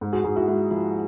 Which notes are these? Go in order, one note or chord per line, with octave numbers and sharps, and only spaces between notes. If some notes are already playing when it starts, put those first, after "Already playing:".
G#2
F#4 G#4
G#2 F#4 G#4
E4 F#4
G#3 E4
F3 E4